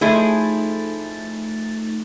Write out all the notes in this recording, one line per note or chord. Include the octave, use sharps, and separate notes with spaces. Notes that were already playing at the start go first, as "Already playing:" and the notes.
F3 A3 D#4 E4 G#4 A6